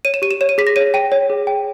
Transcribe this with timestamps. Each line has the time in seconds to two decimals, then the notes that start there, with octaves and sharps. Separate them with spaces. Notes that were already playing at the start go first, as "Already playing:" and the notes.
0.05 C#5 D#7
0.14 E7
0.22 G4 D#7
0.31 E7
0.41 C#5 E7
0.49 D#7
0.58 G#4 B6
0.67 A#6
0.76 C#5 D#7
0.94 G5 D#7
1.12 C#5
1.30 G#4
1.47 G5